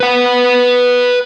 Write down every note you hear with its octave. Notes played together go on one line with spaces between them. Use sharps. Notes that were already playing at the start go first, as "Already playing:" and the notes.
B4 F#5